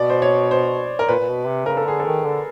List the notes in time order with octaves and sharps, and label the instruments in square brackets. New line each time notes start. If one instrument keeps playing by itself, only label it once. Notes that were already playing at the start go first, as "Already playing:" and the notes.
Already playing: [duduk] B2 [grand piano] D5
[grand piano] C5
C#5
C5
A#4
[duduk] A#2 [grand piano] B4
[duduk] A#2
B2
C3
[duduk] C#3 [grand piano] A#4
[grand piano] A4
[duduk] D3 [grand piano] G#4
[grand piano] A4
[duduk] D#3
D3